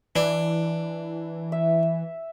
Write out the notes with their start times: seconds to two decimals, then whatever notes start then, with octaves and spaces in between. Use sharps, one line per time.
0.16 E3 D4
1.52 E5